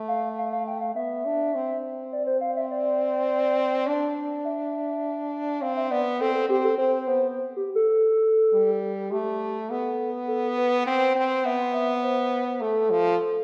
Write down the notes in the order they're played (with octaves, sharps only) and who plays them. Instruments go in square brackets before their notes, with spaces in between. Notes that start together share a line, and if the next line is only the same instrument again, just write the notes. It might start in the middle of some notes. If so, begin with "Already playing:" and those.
Already playing: [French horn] A3
[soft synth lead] F5
F5
F5
G5
F5
[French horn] B3 [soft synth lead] E5
[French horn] D4
C4
[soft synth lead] D5
C5
F5
E5
D5
[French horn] D4
[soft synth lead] E5
[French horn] C4 [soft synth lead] F5
[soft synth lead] E5
[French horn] B3 [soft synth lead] D5
[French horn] C4 [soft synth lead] A4
[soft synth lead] A4
[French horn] C4 [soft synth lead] G4
[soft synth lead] A4
[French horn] C4 [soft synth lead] C5
[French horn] B3 [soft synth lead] C5
[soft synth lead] G4
A4
[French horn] G3
[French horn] A3 [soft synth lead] G4
[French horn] B3 [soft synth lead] A4
[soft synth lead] A4
B4
[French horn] C4 [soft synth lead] C5
[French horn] C4
[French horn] B3 [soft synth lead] E5
[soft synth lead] E5
C5
[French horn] A3 [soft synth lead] A4
[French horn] F3